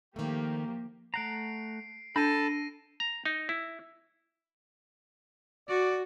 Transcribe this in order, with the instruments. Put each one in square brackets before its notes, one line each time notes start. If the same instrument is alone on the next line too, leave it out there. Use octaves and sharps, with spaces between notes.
[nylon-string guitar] D#3 A3 [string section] F3 A#3 G4
[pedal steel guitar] A3 F#5 A#5 [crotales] C7 D7
[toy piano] D4 [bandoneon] A4 A5 [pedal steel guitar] B5 E6 [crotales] A#6 D#7
[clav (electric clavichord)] A#5
D#4
E4
[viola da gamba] F#4 [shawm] D5